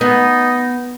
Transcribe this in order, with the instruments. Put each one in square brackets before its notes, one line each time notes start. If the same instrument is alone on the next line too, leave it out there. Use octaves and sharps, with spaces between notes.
[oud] B3 [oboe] D#4